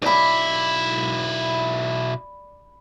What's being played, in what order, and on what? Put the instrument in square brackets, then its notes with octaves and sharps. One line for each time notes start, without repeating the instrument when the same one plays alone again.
[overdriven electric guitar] B1 E4 [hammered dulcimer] D5 B5